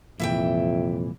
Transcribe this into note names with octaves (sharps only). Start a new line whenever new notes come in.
C2 F2 A#2 E3 E5 F5 G5